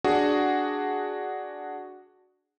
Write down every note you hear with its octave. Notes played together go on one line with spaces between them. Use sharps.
D4 F#4 G#4